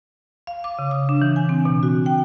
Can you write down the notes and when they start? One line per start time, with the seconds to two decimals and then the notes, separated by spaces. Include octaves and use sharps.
0.47 F5
0.64 D6
0.79 C#3
0.91 D#6
1.09 D4
1.22 E3
1.36 G#5
1.49 C4
1.65 B2
1.83 F#4
2.06 G5